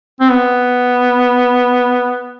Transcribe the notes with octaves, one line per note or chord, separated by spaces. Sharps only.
C4
B3